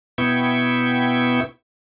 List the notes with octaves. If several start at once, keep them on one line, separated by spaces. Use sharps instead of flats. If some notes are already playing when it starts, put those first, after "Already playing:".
B2 B3 E4 E5 G5 C#6